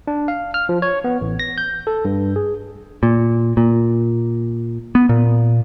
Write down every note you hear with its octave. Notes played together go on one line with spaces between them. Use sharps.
D4
F5
F6
F3
C#5
B3
A1
A#6
G6
A4
G2
G#4
A#2
A#2
B3
A#2